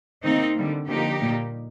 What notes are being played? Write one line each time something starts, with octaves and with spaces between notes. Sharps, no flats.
C3 D#3 A#3 C4 D#4
D3 G3 A#3
D3 F3 A#3 D#4 G4
A#2 G3 A#3